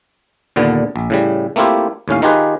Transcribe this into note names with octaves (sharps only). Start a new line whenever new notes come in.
D#2 A#2 D3 B3
A#1
A2 C#3 G3
A3 A#3 C4 E4 F4 G4
D#2 A2 C#4 F5
D#3 D#4 F4 G4 G#4 B4